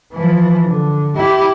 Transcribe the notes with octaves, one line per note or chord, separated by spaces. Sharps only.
E3 F3
D3
E4 G4